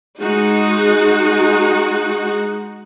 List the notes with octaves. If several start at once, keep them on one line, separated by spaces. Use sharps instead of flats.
G#3 D#4 F#4